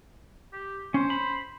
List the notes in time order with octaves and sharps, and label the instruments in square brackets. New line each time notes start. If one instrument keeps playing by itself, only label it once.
[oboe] G4
[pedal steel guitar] C#4 [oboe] C5
[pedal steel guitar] B5